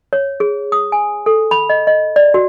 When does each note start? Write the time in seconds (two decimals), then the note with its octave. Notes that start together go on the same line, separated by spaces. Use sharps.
0.13 C#5
0.40 G#4
0.72 D#6
0.92 G#5
1.26 A4
1.51 B5
1.69 D#5
1.87 D#5
2.16 D5
2.34 F#4